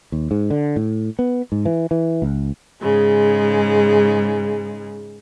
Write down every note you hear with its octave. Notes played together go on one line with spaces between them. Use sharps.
D#2
G#2
D3
A2
B3
G#2
E3
E3
C#2
G#2 C#3 G#3